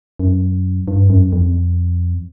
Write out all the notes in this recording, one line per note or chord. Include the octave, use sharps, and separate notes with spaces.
F#2
G2
F#2
F2